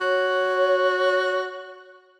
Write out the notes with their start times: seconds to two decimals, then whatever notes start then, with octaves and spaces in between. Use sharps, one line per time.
0.01 F#4 C#5